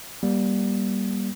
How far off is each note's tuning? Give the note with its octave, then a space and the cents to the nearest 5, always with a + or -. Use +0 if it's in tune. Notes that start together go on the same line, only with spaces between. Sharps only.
G3 +0 A#3 +40